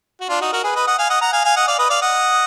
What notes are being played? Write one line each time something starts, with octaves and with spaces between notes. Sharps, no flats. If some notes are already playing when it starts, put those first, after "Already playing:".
F#4
D4 F4
D#4 F#4
F#4 A#4
G#4 B4
B4 D#5
D#5 F#5
F5 G#5
D#5 F#5
F#5 A#5
F5 G#5
F5 G#5
D#5 F#5
D5 F5
B4 D#5
D5 F5
D#5 F#5